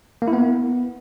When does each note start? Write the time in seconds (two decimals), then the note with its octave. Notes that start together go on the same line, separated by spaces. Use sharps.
0.22 A#3
0.28 E4
0.33 B3